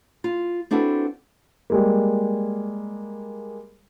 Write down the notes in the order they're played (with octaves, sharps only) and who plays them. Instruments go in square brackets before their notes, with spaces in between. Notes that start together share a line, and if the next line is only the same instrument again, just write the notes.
[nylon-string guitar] F4
C4 D4 E4 F#4 A4 B4
[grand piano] G3 G#3 A#3